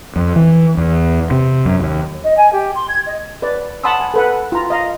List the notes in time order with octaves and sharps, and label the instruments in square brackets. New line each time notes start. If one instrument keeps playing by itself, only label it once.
[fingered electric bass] F2
E3
E2
C3
F#2
D#2
[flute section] D#5
G#5
G4
C6
G#6
D#5
[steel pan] B4 D5
F#5 A5 B5 C6 D#6 E6
G#5
A4 B4 F#5
F4 A#5
D#5 F5 A#5